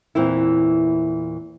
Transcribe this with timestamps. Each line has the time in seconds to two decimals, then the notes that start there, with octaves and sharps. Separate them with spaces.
0.15 E2 A#2 E3 C4 E4